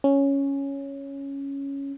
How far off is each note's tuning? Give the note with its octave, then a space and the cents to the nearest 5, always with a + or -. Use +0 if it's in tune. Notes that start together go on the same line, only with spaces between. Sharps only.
C#4 +0